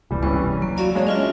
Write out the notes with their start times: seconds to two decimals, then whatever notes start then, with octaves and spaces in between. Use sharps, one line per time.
0.11 E1 C#2 C3 E3 G3
0.23 E3 G3 C#4 C#6
0.62 F#3 A#3
0.78 F#4 D5 F5
0.95 G#3 D4 F#4 C#5
1.07 C#4 F4 D#5 E5